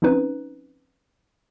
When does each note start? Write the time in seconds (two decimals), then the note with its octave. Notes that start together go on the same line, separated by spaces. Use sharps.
0.02 F3 C4 C#4 D#4 B4